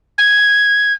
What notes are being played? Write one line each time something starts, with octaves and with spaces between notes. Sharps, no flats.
G#6